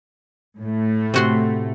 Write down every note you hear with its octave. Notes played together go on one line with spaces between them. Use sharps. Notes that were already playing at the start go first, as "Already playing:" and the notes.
A2 A3
C3 F#4 C6